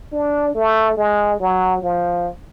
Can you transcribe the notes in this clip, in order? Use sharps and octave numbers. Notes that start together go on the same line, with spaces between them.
D4
A3
G#3
F#3
F3